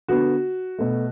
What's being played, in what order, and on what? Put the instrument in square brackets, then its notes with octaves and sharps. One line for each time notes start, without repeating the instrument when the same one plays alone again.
[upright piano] D3 B3 F#4
B2 A3